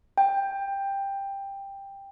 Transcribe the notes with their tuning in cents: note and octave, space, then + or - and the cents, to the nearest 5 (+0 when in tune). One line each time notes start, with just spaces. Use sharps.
G5 +10